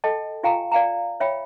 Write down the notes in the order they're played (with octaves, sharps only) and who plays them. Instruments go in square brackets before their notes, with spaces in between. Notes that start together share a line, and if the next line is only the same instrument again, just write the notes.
[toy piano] A4 D#5 G5 A5
F4 G4 F5 G5 G#5 A#5
D5 F5 G5 A#5
C#5 E5 G5 B5